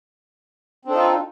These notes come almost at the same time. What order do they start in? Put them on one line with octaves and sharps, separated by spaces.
C4 D4 A4 D#4 F4